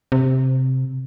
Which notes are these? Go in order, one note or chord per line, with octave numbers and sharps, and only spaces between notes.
C3